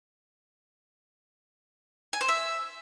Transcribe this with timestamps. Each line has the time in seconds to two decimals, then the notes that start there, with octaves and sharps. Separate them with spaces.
2.13 G#5
2.21 C5
2.28 E5